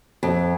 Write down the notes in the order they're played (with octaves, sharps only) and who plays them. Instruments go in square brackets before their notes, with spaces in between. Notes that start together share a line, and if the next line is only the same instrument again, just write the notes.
[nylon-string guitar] F2